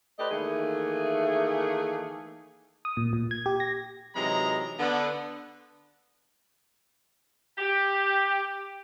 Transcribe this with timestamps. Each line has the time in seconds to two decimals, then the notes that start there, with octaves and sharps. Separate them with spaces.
0.19 A3 G4 B4 C5 D5 D#5
0.31 D#3 E3 A3 A#3 G#4
2.85 D#6
2.97 A#2
3.13 A#2
3.31 G#6
3.46 G4
3.60 A#6
4.15 C3 E3 F#3 G#3 D#4 A#5
4.79 D3 B3
7.58 G4